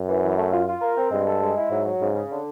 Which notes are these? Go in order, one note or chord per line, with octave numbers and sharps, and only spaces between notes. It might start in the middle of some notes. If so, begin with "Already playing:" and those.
Already playing: F#2
E3
E3
A3
F4
F4
A#4
C4
G2 G#3
A4
G#3
E4
G#2 F#3
F#3
G#2 C#3
C#3
D3